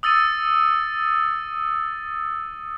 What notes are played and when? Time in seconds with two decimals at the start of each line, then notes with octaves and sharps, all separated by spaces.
0.03 D#6 E6 A6 C#7 D#7